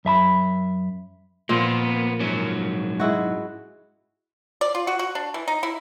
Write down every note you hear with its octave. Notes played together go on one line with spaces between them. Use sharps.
F#2 E5 A#5 B5
A#2 F3 A#3 B3 F4
G#2 F#3 C#4
G#3 E4 F#4
D5
F4
F#4
F#4
D4
E3
D#4
E4